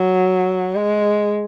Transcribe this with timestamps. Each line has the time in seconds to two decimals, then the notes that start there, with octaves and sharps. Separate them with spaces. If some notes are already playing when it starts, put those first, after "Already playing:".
Already playing: F#3
0.75 G#3